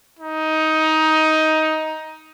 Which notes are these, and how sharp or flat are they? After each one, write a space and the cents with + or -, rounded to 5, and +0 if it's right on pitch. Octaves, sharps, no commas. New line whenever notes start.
D#4 +15